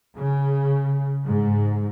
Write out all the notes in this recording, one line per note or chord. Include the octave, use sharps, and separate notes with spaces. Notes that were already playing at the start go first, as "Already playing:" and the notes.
C#3
G#2